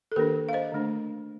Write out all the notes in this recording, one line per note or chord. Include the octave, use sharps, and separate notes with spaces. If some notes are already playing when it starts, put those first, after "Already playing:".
A4
D#3 A#3 D4 G4 A#4
F5
C5 D#5
D3 A3 D4